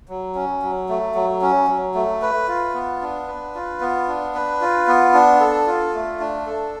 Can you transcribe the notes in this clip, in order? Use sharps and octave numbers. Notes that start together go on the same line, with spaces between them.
F#3
C#4
F#3
A3
F#3
C#4
F#3
A3
B4
F4
B3
D4
B4
F4
B3
D4
B4
F4
B3
D4
A4
F4
A3
D4
A4